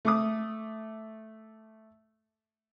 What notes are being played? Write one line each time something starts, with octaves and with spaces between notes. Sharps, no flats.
A3 D6 D#6